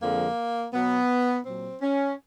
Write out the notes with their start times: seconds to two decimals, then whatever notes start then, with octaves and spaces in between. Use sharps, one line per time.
0.01 F2 D3 F3 G#3 A#3
0.73 B2 F#3 B3
1.45 A#2 F#3 C4
1.82 C#4